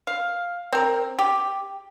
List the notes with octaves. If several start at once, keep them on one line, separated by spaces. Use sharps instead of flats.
F5
C4 A#4
G4